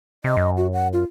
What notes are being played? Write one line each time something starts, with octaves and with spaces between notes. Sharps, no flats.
C3 D#5
F#2
F#4
F#5
F4